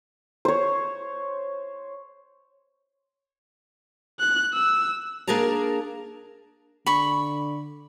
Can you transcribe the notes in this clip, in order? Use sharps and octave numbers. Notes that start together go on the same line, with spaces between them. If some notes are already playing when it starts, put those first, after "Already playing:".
C5 C#5
F#6
E6
A#3 D4 G#4 A#4 A5 A#5
D3 B5 C#6